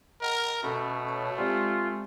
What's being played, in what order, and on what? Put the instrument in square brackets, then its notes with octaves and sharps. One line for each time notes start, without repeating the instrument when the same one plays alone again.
[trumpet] A#4 [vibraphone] D#5 F#5 G5
[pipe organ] B2 [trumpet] A3 [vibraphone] C#4 [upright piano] A4 A#5 B5
[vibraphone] C#5 A5 C#6
[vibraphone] G#3 [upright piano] C4 G4 D5 [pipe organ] F4